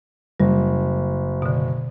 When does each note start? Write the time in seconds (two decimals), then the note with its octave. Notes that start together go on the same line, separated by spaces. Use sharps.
0.40 F#1 G3
1.42 B2 D3